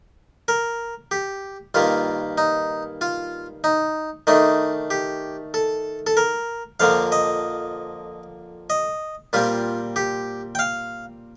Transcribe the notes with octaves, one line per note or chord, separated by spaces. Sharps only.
A#4
G4
G2 D#3 A#3 F4
D#4
F4
D#4
D#3 A3 D4 D#4
G4
A4
A4
A#4
F2 D3 F3 A#3 F5
D#5
D#5
A#2 G3 C4 F4
G4
G5
F5